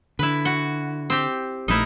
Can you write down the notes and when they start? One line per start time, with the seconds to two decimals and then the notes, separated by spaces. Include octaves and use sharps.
0.19 D3 E4 B4
0.45 F#4
1.10 C4 G4
1.68 A#1 F3 A3 D#4 E4 A#4